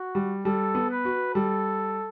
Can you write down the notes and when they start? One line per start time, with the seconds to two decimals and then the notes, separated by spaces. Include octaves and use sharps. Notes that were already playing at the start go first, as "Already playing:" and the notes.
Already playing: F#4
0.15 G3
0.45 G3 A4
0.75 B3
0.90 B4
1.05 F#4
1.34 G3 A4